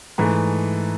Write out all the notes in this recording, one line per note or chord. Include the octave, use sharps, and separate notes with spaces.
G#2 E3 A3